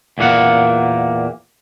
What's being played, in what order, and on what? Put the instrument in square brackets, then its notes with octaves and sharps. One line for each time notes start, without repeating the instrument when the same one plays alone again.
[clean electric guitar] E2 A#2 A#3 F#5